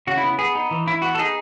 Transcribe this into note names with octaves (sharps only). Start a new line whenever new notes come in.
C#3 F#4
E4
B3
B3 G#4
D#4
E3
E3 E4
B3 F#4
A4
D#4 G#4